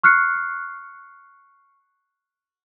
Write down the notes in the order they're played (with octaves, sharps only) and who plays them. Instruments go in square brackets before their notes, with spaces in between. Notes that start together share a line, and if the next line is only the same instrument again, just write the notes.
[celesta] C#6 F6 F#6 C7 C#7